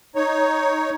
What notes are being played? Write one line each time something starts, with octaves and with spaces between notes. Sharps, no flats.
D#4 C#5